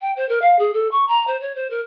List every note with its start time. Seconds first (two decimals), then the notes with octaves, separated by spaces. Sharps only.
0.01 G5
0.16 C5
0.29 A#4
0.42 F5
0.59 G#4
0.74 A4
0.91 C#6
1.08 A#5
1.27 C5
1.40 C#5
1.55 C5
1.70 A#4